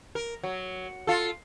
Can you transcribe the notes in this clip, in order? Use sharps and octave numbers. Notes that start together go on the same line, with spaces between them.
A#4
F#3
F4 A4